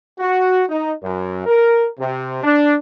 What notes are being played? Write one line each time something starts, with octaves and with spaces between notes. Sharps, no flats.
F#4
D#4
F#2
A#4
C3
D4